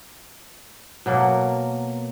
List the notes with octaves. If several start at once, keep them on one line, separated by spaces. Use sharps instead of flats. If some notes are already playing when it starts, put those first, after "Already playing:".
B2 F#3 A#3